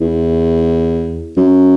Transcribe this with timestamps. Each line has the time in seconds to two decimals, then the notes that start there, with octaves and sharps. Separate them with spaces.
0.01 E2
1.37 F#2